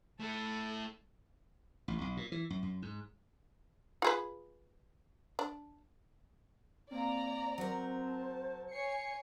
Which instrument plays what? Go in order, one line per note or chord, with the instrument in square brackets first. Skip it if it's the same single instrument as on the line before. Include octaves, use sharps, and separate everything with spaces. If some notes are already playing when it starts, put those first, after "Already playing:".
[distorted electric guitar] A3 E4 [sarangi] A4
[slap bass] A1
B1
A#2
E3
F#2
F#2
G#2
[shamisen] F4 G#4 B4
D4
[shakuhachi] A#3 [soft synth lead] C4 [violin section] D5 A#5
[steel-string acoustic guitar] F#3 A#4 [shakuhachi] C5
[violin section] A5
[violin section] C#5 G#5 C#7 [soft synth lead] C7